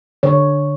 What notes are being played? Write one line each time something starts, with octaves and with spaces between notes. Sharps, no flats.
D3 C#5